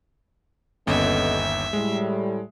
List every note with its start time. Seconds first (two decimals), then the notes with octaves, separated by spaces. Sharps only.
0.87 G1 D#2 B3 C#4 A4 D#5 E5
1.73 A2 G3 G#3